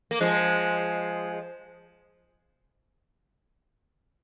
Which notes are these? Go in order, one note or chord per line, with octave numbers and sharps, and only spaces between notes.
A#3
F3 G#3